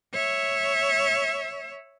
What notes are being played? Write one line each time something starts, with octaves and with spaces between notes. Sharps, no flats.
C#5 E5